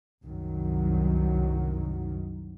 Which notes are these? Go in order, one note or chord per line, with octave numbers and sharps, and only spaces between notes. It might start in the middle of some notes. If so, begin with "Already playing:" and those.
C2 F#2 D#3 F#3